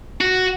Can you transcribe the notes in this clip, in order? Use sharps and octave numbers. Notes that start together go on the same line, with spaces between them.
F#4